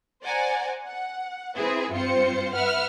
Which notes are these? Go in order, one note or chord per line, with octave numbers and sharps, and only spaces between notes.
C5 D5 F#5 G#5 A#5
F#5
C4 E4 G#4 B4 E5
G2 C4 F4 C5 C#7
B4 E5 F#5 F6